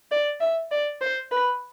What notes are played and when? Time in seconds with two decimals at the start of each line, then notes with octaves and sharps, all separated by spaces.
0.11 D5
0.41 E5
0.71 D5
1.01 C5
1.31 B4